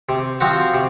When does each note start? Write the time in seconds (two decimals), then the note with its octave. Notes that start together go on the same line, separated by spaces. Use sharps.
0.09 C3
0.41 F3 C4 F#4
0.74 C3